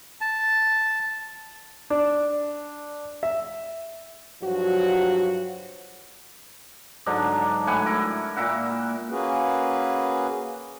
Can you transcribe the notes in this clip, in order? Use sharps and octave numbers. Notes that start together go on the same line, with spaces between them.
A5
D4
E5
G2 F3 F#3 F#4
G#2 D3 F#3 D4
A2 B4 F#5 G#5
E4 A#4
A#2 A#4 E5 F#5
A#3 C#4 F#4 G#4 B4